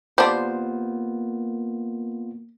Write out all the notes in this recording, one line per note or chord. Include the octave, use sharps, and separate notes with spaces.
G3 A#3 B3 D4 F4 C5